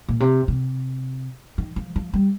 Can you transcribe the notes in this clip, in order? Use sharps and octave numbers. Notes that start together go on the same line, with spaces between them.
A#2
C3
C3
D#3
F3
F3
G3